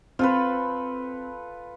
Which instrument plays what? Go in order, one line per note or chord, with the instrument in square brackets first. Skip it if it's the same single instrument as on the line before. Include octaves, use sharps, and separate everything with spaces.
[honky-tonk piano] C4 [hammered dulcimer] F4 A4 B4